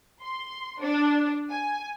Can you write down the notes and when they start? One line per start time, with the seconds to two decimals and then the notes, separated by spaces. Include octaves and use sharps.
0.21 C6
0.80 D4
1.49 G#5